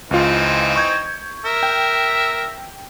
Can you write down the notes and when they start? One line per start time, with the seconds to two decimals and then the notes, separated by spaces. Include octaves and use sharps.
0.11 C#2 E3 C4 D#4 F4
0.76 C#6 G6 G#6
1.45 A#4 E5
1.63 G5